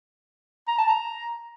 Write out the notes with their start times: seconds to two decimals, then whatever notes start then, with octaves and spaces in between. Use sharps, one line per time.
0.68 A#5
0.79 A5
0.89 A#5